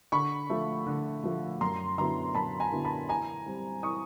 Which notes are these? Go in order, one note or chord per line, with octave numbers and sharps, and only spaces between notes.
D3 B5 C#6
F3 A3
D3
F3 A3
F#2 A#5 C6
D3 F#3 B3 E4 A#5 C6
F#2 A5 B5
G#5 A#5
D3 F#3 B3 E4
A5 B5
E3 G#5 A#5
G3 C4
E3 C#6 D#6